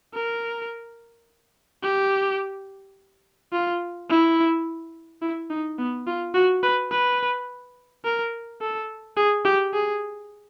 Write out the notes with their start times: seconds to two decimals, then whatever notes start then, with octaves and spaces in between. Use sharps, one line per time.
0.14 A#4
1.83 G4
3.53 F4
4.09 E4
5.22 E4
5.50 D#4
5.79 B3
6.07 F4
6.35 F#4
6.63 B4
6.91 B4
8.05 A#4
8.61 A4
9.17 G#4
9.45 G4
9.73 G#4